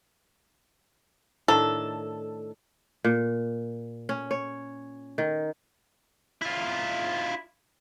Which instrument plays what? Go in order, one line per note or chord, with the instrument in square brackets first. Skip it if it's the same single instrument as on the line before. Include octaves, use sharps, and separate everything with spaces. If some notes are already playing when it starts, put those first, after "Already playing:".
[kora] A2 D#3 D4 [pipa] A4
[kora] A#2
C#4
C#5
D#3
[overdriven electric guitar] E4 F4